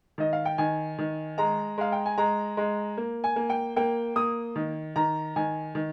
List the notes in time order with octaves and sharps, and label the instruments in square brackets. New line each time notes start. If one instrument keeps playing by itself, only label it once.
[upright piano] D#3 D#5
F5
G5
D#3 G#5
D#3
G#3 A#5
G#3 F5
G5
G#5
G#3 A#5
G#3
A#3
G#5
A#3
G5
A#3 G5
A#3 D#6
D#3
D#3 A#5
D#3 G#5
D#3